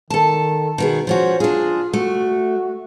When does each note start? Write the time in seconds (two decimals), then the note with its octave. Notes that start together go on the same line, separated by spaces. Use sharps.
0.10 D#3 A4 A5
0.78 B2 D#3 B3 G#4
1.07 F3 C#4 F#4 C5
1.40 D4 F4 G#4
1.93 A3 F#4